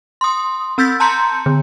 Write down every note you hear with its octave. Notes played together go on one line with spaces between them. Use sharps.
C6 D#6
C4 E6 G6 A6 B6
A5 A#5 C6 G6 C#7
D3